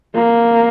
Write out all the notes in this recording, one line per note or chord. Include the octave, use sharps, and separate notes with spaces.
A#3